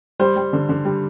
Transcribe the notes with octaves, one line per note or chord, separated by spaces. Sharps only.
G3 C5
G3
D3
D3
G3